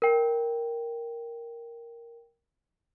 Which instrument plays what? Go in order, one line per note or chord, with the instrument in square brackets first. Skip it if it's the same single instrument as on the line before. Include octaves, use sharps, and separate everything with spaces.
[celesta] A#4 G5